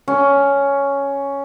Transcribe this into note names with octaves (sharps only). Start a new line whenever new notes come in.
C#4